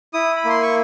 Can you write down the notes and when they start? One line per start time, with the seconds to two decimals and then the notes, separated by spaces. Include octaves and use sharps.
0.13 E4 D#6
0.36 B5
0.45 A#3 C6
0.63 C#6